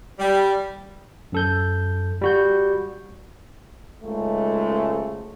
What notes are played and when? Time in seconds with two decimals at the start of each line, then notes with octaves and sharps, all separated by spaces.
0.19 G3
1.32 F#2 A4 G6
2.21 G3 F#4 G6
4.02 C#2 G#2 C#3 F#3 G#3 A3